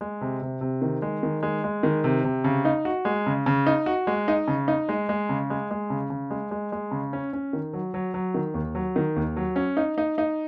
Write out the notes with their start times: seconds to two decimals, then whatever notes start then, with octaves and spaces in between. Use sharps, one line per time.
0.01 G#3
0.21 C3
0.42 C3
0.61 C3
0.82 D#3
1.02 G#3
1.23 D#3
1.43 G#3
1.64 G#3
1.83 D#3
2.04 C3
2.24 C3
2.44 C#3
2.65 D#4
2.85 F#4
3.05 G#3
3.27 C#3
3.46 C#3
3.67 D#4
3.86 F#4
4.07 G#3
4.28 D#4
4.48 C#3
4.68 D#4
4.89 G#3
5.09 G#3
5.29 C#3
5.50 G#3
5.71 G#3
5.90 C#3
6.10 C#3
6.30 G#3
6.51 G#3
6.72 G#3
6.91 C#3
7.13 C#4
7.33 C#4
7.53 D#3
7.73 F#3
7.94 F#3
8.14 F#3
8.34 D#3
8.54 D#2
8.75 F#3
8.96 D#3
9.16 D#2
9.37 F#3
9.56 C#4
9.77 D#4
9.98 D#4
10.18 D#4